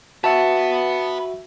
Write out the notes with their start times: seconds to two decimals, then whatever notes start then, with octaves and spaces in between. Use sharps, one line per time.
0.24 F#4 B4 E5 F#5 A5